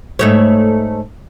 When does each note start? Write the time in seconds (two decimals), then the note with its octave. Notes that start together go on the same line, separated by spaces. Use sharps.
0.19 G#2 A3 C#5